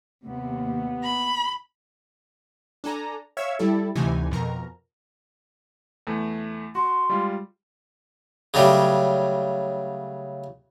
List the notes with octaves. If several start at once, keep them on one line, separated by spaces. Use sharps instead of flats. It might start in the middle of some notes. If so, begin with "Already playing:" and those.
D#2 C3 B3
B5
D4 A4 G#5 A#5
C#5 E5 F5 E6 G#6
G3 E4 A4
D2 C3 E3 D#4 G#5
F2 B2 A#4 A#5
E2 A3
F#4 C6
G3 G#3 F4
C#3 F#3 G3 A3